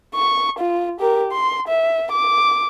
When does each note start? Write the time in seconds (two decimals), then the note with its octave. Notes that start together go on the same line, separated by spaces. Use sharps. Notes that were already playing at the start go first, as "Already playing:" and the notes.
0.15 C#6
0.58 F4
1.00 G4 A#4
1.32 C6
1.68 E5
2.12 D6